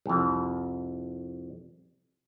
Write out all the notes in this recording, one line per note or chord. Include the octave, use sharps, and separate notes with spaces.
C2 F2